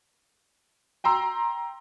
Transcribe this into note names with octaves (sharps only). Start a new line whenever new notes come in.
G5 A#5 C6 E6